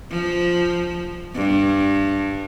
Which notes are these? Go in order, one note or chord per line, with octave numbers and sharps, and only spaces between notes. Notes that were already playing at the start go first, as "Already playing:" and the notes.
F3
G2